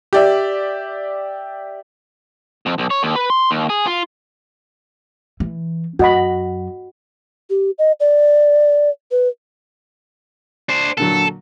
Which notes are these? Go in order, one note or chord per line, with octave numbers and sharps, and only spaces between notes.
G4 D5 E5
F2
B1
C#5
D#2
B4
C6
D#2
G#4
F4
E3
F#2 F#4 D#5 B5
G4
D#5
D5
B4
D4 C5
A#2 D3 F#3 A4